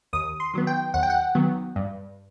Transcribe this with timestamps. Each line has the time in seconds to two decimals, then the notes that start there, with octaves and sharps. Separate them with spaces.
0.13 D#2 D#6
0.40 C6
0.54 D#3 F#3 B3
0.67 G5
0.94 D#2 F#5
1.03 G5
1.10 F#5
1.35 D#3 F#3 B3
1.76 G2